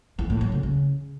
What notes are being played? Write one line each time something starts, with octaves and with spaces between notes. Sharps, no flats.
E3
A2
F#3
C#3
C#3